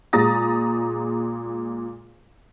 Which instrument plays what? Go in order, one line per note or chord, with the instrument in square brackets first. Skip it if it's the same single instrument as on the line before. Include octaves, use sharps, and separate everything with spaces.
[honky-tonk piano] A#2 G#3 A#5 D#6 A6 A#6